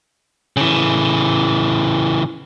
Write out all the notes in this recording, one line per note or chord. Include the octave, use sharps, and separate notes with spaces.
C#3 E3